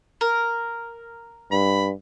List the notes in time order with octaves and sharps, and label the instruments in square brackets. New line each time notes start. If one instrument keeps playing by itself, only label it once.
[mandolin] A#4
[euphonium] G2 [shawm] B5